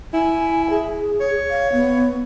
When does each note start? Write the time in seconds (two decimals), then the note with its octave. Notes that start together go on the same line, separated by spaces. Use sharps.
0.14 E4 G#5
0.70 G#4
1.20 C#5
1.50 F5
1.72 B3